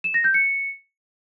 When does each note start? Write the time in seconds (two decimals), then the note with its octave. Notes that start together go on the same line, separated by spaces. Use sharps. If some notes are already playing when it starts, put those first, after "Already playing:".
0.04 E7
0.14 A#6
0.24 G6
0.34 C#7